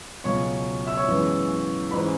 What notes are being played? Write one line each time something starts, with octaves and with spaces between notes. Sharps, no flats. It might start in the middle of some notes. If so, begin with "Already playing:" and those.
C#2 B2 F#3 C#4 C#5 C#6
E5 E6
C#5 C#6
F#2 E3 G#3 B3
G#2 E3 C#4 B4 B5